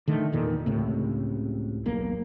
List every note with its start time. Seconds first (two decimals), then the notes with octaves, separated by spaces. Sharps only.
0.07 D3 D#3 A3
0.32 E2 A#2 D#3
0.66 C#2 A2 C3
1.86 E1 B1 A#3